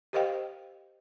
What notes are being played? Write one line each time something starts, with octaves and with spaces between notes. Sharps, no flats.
G4 A#4 C5 D#5 F5 G5